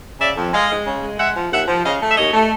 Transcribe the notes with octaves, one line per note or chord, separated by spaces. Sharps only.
C#3 D5 E5
F2
G#3 D#5 F5
G#3
C#3
G#3
G#3 E5 F#5
F3
D#2 E5 F#5
F3
C#3 D#5 F5
A3
E5
D#2 C#5 D#5
A3